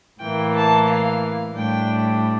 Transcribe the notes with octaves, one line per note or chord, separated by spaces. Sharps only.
A2 E3 A#3 G5
A5
F5
A2 G3 D4 G5